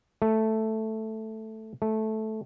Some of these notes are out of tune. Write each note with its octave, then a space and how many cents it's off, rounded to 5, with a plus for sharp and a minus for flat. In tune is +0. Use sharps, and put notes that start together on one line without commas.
A3 +0
A3 -10